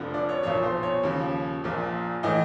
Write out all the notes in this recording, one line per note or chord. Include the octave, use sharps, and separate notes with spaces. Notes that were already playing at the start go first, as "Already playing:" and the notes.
Already playing: F1 F2 D3 F3
D5
C#5
B1 A#2 F3 C#5
C5
C#5
D#2 C#3 F3
A#1 A#2 F3
A2 E3 D#5